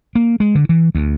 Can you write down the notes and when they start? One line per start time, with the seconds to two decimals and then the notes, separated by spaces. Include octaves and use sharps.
0.15 A#3
0.40 G#3
0.55 D3
0.69 E3
0.95 D2